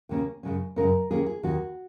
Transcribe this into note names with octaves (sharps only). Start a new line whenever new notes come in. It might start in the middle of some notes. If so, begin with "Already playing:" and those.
D#2 C#3 A#3 C#4
F#2 C#3 G#3 C#4
F#2 C#3 G#3 C#4 A#4
D#2 D#3 A#3 C#4 G#4
G#4
D#2 D#3 A#3 C#4 F#4